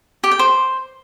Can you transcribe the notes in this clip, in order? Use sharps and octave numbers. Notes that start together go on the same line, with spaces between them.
G4
G5
C5